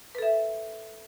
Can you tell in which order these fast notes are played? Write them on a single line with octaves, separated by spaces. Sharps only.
B4 A4 E5